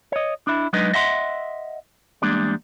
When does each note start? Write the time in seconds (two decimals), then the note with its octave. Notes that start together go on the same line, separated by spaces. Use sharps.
0.12 C#5 D#5
0.47 D4 E4
0.73 F#3 G#3 D4 D#4 B4 D#5
0.93 D#5 E5 F#5 C6
2.22 E2 G3 G#3 A#3 D4